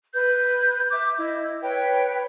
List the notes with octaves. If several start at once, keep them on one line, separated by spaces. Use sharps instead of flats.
B4 G6
E5 D6
E4 D#5
B4 C#5 G5